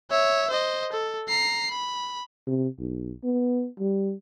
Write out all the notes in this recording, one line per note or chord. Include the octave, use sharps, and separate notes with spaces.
C#5 E5
C5 D#5
A4
A#5 C7
B5
C3
B1
B3
G3